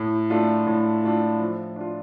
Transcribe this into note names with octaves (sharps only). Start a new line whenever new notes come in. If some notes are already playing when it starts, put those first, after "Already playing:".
Already playing: A2
A3 D4 F4
A2
A3 D4 F4
F3
D4 F4